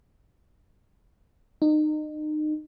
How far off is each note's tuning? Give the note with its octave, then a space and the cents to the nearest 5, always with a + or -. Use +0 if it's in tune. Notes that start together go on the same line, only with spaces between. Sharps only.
D#4 -30